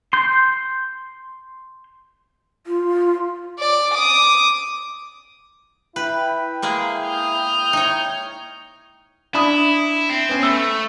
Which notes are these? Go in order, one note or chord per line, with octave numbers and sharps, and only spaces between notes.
C6 G6
F4
D5
D6 D#6
E4 B4 G5
G#3 A#3 G#4
D#6 F6 G6
D#4 C#5
D4 E4 B5 D#6
C4
B3 C#4
A3 B5 E6